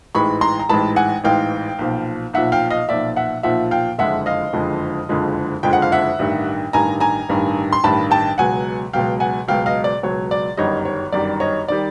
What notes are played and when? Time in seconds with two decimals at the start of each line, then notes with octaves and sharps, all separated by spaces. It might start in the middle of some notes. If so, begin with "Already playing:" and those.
0.15 A1 G#2 E3 G#3 B5 C#6
0.41 A#5 C6
0.60 A#5
0.69 A1 G#2 E3 G#3 A5 B5
0.96 F#5 G#5
1.24 A1 G#2 E3 G#3 F5 G5
1.79 B1 A#2 F3
2.34 B1 A#2 F3 E5 F#5
2.52 F5 G5
2.70 D#5 F5
2.88 B1 A#2 F3 D5 E5
3.16 E5 F#5
3.43 B1 A#2 F3 E5 F#5
3.71 F5 G5
3.98 F#1 F2 D3 F3 G#3 E5 F#5
4.26 D#5 F5
4.53 F#1 F2 D3 F3 G#3
5.09 F#1 F2 D3 F3 G#3
5.63 F#1 F2 D3 F3 G#3 G5
5.73 F#5
5.82 F5
5.92 E5 F#5
6.19 A1 G2 D#3
6.73 A1 G2 D#3 G#5 A#5
7.00 G#5 A#5
7.29 A1 G2 D#3
7.73 C6
7.84 A1 G2 D#3 A5 B5
8.11 G5 A5
8.38 C#2 B2 F#3 F#5 G#5
8.93 C#2 B2 F#3 F5 G5
9.20 F#5 G#5
9.48 C#2 B2 F#3 F5 G5
9.66 D#5 F5
9.84 D5
10.03 C#2 B2 F#3 C#5
10.31 D5
10.57 G1 F#2 D#3 G3 C#5 D#5
10.85 C#5
11.12 G1 F#2 D#3 G3 D5
11.40 C#5 D#5
11.68 D#3 G3 D5